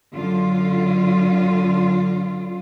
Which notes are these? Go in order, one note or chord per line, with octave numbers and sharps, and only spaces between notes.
F#2 D3 F4